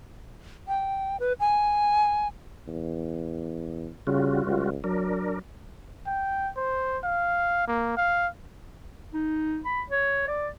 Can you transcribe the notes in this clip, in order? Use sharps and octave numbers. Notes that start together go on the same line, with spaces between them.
G5
B4
G#5
E2
C#3 G3 F4 F#4
C#2
F#3 D4 A#4
G5
C5
F5
A#3
F5
D#4
B5
C#5
D5